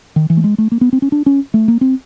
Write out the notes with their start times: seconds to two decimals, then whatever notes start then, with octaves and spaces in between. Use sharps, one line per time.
0.16 D#3
0.30 E3
0.37 A3
0.44 G#3
0.58 A3
0.72 A#3
0.81 B3
0.93 C4
1.02 C#4
1.12 D4
1.26 C#4
1.54 A3
1.68 A#3
1.81 C4